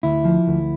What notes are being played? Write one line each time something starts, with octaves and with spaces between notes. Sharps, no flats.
D2 E4
F3
D2